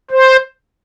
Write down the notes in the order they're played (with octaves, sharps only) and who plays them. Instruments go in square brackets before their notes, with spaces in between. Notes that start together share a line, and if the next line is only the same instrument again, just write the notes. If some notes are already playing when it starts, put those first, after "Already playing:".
[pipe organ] C5